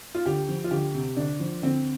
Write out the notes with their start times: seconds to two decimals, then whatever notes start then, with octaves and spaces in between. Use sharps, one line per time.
0.15 F4
0.26 D2 G4
0.49 F3
0.64 F4
0.71 D2 G4
0.94 C3
1.16 D2 D4
1.40 F3
1.62 D2 C4